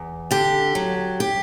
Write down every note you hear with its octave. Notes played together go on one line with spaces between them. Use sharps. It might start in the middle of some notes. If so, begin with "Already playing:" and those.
Already playing: E2
D3 G4
F#3
G4